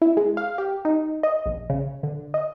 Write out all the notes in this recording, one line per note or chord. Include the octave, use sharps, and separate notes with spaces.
E4
G#3
F5
G4
D#4
D#5
A#1
C#3
D3
D#5